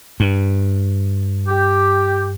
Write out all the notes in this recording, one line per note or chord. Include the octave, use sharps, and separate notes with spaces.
G2
G4